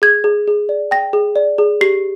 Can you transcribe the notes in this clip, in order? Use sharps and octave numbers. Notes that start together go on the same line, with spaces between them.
G#4 G#6
G#4
G#4
D5
G5 A#6
G#4
D5
G#4
G4 C7